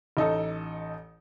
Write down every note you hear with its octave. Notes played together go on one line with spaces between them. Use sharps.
A1 D#4 A4